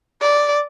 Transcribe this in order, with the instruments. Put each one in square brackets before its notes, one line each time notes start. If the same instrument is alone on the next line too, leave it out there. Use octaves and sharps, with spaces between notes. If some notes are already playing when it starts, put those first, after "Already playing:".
[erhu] D5